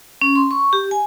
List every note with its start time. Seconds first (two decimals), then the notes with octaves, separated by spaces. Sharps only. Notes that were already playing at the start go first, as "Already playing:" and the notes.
0.21 C#4
0.36 C6
0.51 C#6
0.73 G4
0.91 G#5